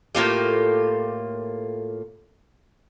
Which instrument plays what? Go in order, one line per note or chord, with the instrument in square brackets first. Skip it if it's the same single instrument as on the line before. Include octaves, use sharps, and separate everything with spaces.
[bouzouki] A2 A#3 F4 G4